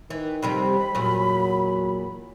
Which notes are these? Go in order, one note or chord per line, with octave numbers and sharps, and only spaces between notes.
D#3 E3
F2 C3 G3 B5
E2 A#2 F#3